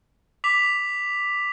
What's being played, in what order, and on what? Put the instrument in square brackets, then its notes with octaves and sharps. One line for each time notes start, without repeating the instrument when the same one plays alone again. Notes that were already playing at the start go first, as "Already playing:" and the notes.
[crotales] D6 B6 F7